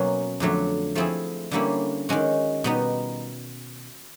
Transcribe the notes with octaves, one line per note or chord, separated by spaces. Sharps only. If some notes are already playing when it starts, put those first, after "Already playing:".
Already playing: B2 F#3 A#3 C#4
F2 D3 F#3 A3
F3 A3 C4 E4 G#4
D3 G3 A#3 C#4 E4
D#3 G#3 C#4 F#4
B2 G3 B3 D#4